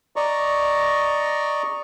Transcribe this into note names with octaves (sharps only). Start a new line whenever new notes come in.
D5 D#5 A#5 C#6